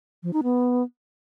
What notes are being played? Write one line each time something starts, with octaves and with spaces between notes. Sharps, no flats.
F3
D#4
B3